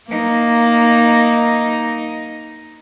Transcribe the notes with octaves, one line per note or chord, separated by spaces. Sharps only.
A#3 D#4